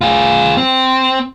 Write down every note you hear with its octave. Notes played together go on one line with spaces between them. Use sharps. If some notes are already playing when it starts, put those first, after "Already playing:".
F4 G#4
C4